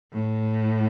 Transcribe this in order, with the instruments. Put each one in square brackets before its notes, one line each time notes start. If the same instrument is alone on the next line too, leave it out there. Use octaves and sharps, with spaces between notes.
[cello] A2